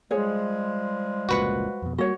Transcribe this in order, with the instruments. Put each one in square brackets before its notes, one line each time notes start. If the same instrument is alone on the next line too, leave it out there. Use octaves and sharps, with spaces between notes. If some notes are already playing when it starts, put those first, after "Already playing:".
[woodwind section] F3 G3 G#3 [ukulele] G#4 C#5
[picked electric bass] F1 C#2 A#2 [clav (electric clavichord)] F#4 B4 F#5
[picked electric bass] F2 B2
[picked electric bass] G3 A#3 [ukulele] F#4 C#5